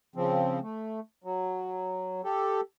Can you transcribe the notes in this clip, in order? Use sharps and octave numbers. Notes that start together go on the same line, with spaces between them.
C#3 F3 C4
A3
F#3
G4 A4